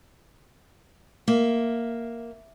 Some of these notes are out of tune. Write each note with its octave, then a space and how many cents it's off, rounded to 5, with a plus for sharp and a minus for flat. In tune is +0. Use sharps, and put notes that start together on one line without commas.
A#3 +0 E5 +0